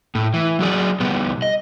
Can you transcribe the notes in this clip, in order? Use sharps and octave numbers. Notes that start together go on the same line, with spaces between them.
A2
E3
F#3 F#4 G#4 D5
B2 G3 B3
D#5